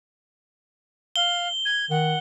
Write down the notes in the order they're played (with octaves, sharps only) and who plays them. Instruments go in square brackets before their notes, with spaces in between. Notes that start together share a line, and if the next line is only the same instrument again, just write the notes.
[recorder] F5 [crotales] G7
[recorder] G#6
[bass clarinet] D#3 [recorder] F#5